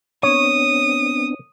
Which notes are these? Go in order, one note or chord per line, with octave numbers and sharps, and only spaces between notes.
B3 C4 D4 C#5 D#6